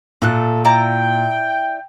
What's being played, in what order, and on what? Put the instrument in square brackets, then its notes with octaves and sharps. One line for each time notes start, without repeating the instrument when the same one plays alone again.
[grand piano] A#2 [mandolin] A3 A4 F#6
[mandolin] E4 D5 A#5 [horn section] G5